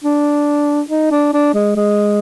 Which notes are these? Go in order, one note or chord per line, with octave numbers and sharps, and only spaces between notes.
D4
D#4
D4
D4
G#3
G#3